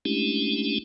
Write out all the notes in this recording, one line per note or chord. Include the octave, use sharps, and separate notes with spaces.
G#3 A3 C#4 D4 E4 G4